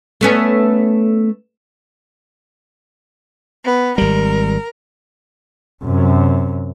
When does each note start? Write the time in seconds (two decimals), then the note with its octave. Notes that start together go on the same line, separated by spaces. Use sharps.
0.21 A3 B3 C#4
3.64 B3
3.98 G#1 G3 A#4
5.84 F#2 C3